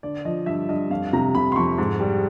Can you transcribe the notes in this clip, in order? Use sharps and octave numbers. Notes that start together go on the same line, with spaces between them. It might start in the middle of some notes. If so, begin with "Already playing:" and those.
D3 D5
F3 D#5
G2 E5
G2 D#5
F2 F5
C3 A#5
C3 B5
C6
F2 C#6
G#2
G3